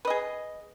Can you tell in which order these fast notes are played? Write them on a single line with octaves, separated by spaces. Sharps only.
B4 D#5 G#4